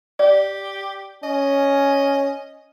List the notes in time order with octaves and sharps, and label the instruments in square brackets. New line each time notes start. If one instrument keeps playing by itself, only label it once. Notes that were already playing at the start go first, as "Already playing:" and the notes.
[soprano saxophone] G4 [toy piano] D5
[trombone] C#4 [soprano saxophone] D#5